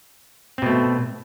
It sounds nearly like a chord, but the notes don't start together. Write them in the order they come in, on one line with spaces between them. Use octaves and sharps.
C4 B2 A3